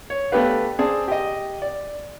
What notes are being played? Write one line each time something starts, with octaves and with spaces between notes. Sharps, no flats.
C#5
A3 B3 D4 G4 B4 F5
C4 G#4 D5 A5
G4 D#5
D5